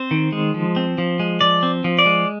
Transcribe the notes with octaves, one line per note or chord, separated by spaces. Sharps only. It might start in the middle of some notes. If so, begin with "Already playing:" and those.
Already playing: C4 C5
D#3
G#3
F3
C4
F3
G#3
F3 D5
C4
F3
D5
G#3